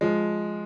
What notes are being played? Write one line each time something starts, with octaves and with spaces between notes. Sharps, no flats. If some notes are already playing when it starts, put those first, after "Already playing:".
F3 G#3